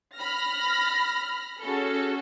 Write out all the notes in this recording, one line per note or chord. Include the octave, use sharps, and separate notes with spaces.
B5 F6 A#6
C#4 F#4 G#4 A4